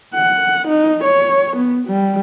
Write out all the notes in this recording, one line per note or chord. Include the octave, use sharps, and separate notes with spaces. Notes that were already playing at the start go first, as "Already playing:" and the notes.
F#5
D#4
C#5
B3
G3